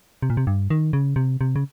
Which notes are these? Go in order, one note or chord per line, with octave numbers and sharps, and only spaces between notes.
C3
A#2
C3
G2
D#3
C#3
C3
C3
C#3